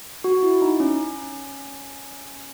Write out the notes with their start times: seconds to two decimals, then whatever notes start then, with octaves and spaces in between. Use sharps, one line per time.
0.24 F#4
0.42 E4
0.62 D#4
0.80 C#4